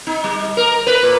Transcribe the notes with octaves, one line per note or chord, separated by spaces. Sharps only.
D#4
G3
A#4
B4
A#2